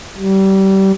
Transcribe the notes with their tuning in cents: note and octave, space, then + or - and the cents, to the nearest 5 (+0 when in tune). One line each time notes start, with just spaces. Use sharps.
G3 -25